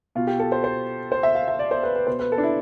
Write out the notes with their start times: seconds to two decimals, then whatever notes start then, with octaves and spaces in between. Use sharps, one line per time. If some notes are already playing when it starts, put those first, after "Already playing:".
0.15 B2 F4
0.27 G4
0.39 A4
0.52 C5
0.64 C5
1.12 C5
1.23 E5
1.35 F5
1.48 E5
1.59 D5
1.71 C5
1.83 B4
1.96 B4
2.07 B2 C5
2.19 B4
2.32 A4
2.38 D4
2.43 E4